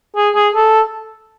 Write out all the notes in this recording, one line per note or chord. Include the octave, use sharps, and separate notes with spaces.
G#4
G#4
A4